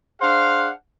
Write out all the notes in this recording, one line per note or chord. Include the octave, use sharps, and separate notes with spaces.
D4 G#4 C5 F5 F#5